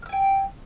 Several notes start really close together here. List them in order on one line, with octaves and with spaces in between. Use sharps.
F6 E6 G#5 G5